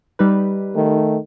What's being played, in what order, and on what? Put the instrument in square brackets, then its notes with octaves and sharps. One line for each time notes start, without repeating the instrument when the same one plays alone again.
[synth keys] G3 D#4 B4
[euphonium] D#3 [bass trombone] A3